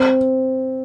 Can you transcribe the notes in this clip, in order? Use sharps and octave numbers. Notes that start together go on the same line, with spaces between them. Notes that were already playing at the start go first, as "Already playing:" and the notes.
Already playing: C4